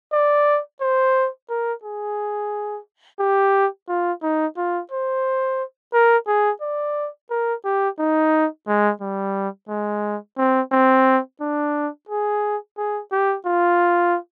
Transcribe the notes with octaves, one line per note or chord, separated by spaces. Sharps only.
D5
C5
A#4
G#4
G4
F4
D#4
F4
C5
A#4
G#4
D5
A#4
G4
D#4
G#3
G3
G#3
C4
C4
D4
G#4
G#4
G4
F4